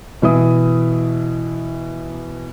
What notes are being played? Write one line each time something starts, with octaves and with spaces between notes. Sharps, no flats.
B2 E3 E5 D#6